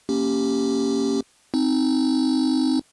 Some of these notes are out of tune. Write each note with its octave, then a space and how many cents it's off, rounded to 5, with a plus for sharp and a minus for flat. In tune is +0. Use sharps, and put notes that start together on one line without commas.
A#3 +0 C#4 +0 G4 +0
C4 +0 D#4 +0